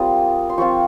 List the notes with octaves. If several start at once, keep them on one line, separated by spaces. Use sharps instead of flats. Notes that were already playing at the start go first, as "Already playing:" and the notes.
Already playing: G3 A#3 C4 F4 D#6
C6
F3 C4 F4 C#6